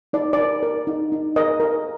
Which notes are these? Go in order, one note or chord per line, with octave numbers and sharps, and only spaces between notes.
D#4 D5
D5
A#4
A#4
D#4
D#4
A#4 D#5
A#4